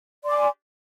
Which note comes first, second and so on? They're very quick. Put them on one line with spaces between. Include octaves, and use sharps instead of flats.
D5 C6 D6 G#5